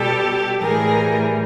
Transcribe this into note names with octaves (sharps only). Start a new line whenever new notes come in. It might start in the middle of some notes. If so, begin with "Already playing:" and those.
Already playing: B2 G3 G4 A4
A2 E3 G3 G#4 A#4